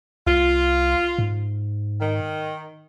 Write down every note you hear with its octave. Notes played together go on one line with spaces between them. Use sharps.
C2 F4
G#2
D#3